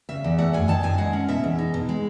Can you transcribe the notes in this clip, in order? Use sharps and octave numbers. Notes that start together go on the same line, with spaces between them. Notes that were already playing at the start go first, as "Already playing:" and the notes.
C#3 E5
E2
A3 F#5
F#2 G#5
D#3 A5
F#2 G#5
G#3 F#5
C#4
B2 E5
E2
D#4
B2
G#3